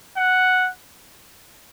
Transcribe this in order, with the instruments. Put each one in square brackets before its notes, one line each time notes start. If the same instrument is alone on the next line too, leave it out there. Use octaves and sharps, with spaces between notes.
[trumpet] F#5